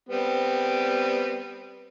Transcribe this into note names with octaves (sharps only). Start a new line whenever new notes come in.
G3 B3 C4